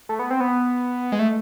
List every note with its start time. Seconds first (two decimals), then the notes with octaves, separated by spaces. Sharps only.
0.09 A3
0.19 B3
0.30 C4
0.40 B3
1.12 G#3
1.19 A3